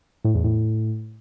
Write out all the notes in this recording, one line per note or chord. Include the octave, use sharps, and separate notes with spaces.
A2
E2
A2